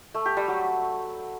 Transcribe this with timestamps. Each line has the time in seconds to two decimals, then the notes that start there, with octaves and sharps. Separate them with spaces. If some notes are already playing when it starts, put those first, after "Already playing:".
0.14 A3
0.26 G4
0.37 G3
0.48 F#3